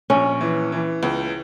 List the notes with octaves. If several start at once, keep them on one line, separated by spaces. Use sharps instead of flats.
A#1 C#4
E3
E3
C#2